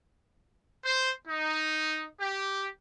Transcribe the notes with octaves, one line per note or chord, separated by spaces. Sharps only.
C5
D#4
G4